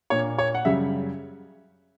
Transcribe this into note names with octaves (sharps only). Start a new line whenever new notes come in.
A#2 A#3 D4 C#5
C#5
F#5
F#2 C#3 G3 E5